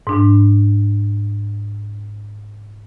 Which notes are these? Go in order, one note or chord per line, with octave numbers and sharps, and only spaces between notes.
G#2 D4